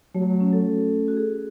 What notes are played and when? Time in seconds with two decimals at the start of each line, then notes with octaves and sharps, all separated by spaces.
0.15 F#3 A3
0.27 A3
0.40 C#4
0.53 A4
1.08 F#4
1.17 G#4